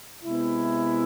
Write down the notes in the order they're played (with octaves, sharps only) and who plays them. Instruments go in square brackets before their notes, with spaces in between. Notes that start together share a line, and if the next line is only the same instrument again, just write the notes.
[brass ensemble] C3 G#3 B3 E4